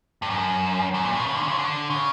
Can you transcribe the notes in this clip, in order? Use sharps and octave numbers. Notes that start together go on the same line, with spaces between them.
G2
F#2
F#2
A#2
B2
C#3
D3
C3
C#3
D3
C#3